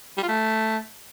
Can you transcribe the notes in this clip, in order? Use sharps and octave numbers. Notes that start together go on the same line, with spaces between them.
G3
F4
A3